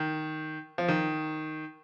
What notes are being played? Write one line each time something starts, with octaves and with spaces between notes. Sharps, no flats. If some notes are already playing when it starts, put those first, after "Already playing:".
Already playing: D#3
F3
D#3